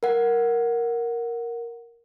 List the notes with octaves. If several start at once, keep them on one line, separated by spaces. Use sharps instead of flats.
A#4 F#5